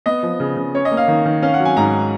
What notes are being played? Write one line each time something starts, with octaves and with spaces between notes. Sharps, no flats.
B3 D#5
F3
C#3
C#3
C#4 C#5
D#5
A#3
F5
D#3
D#3
C#4 F5
F#5
F#3
G#5
G#2 A#5